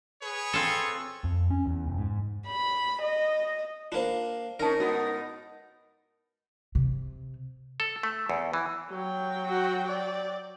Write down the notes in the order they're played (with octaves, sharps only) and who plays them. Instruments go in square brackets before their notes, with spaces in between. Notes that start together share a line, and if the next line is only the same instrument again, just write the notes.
[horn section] G#4 B4 C#5
[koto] C4 F4 A4
[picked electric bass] F2
C#4
E2
F1
G#2
[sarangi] B5
D#5
[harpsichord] A#3 D4 [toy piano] F4 C5
[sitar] C#4 D#4 [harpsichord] A#4 [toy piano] D5 A5
[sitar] G#2 B3 D#4 [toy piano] F#4
[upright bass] C3
[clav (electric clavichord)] A4
A3
E2
E3
[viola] F#3 G5
[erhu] F#4
D5